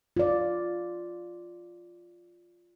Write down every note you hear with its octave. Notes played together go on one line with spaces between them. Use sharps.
F4 D5